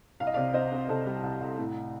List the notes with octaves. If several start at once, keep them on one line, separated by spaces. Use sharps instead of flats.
C2 F5
D#5
C3 D5 F5
C4 C5 D#5
C4
C3 A4 C5
G3
C2
C2
A2